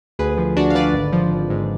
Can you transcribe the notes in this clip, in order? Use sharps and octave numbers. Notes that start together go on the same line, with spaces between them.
D2 G#4 B4
F3
D2 D4 F#4
F5
D3 B4 D5
G#1
F3
G#1
G#2